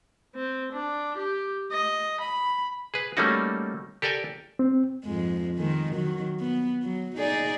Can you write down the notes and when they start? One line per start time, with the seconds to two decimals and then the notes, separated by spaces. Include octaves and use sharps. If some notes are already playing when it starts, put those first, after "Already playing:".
0.35 C4
0.73 D4
1.18 G4
1.71 D#5
2.21 B5
2.94 G#4 B4
3.17 G3 A3 A#3 C#4 D#4 F#4
4.02 G4 A4 A#4 D5 G5 G#5
4.59 C4
5.05 F2 G#2 G#3
5.56 D#3 G#3
5.92 D#3 F#3
6.40 B3
6.84 F#3
7.17 D#4 G#4 D5